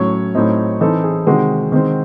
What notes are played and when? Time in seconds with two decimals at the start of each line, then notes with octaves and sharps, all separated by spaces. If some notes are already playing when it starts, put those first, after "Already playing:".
Already playing: A2 F#3 C#4 C#5
0.35 A2 F#3 C4 D#4
0.81 E3 C4 D#4 A4
1.04 G#4
1.26 C3 D#3 G#3 F#4
1.72 D#3 G#3 C4